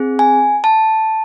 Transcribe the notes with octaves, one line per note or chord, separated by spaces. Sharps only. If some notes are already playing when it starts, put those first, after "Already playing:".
Already playing: C4 G#4
G#5
A5